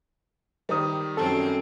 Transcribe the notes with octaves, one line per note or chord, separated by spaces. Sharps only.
D#3 G3 C5 A#5 D#6
F#2 C4 A4